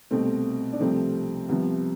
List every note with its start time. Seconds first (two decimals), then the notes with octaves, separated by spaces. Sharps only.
0.11 C2 B2 A3 C4
0.73 D4
0.80 C2 C3 F3 A3 C4
1.48 C2 C3 F3 B3